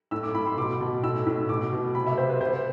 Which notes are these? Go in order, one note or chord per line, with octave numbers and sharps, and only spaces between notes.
A2 E6
D6
A2 B5
C6
B2 D6
B2
A2 E6
A2
B2 D6
B2
C3 B5
E5
C3 C5
B4
C3 C5